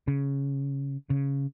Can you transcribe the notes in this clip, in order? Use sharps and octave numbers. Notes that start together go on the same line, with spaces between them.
C#3
C#3